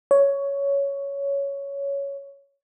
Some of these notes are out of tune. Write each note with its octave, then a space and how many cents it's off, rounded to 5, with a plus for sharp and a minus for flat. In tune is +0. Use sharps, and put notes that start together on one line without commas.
C#5 +10